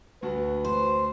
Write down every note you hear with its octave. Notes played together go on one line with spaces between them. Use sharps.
D2 F#4 B4 A5
C5